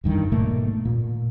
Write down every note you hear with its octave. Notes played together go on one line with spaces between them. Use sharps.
F1 G2 D#3 E3
G#2 B2 A3 A#3
A#2